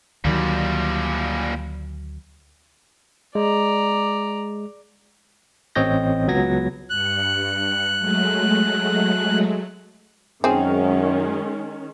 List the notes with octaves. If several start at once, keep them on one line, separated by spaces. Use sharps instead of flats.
D2 A#2 D#3 F#3 G3
G#3 D5 A#5
A1 C4 C#5 D#5 G6 A#6
C#2 F#3 B3 G#6 A#6
G2 F#6 C#7
F#3 G#3 A3
F#2 D#3 G#3 C4 C#4 G#4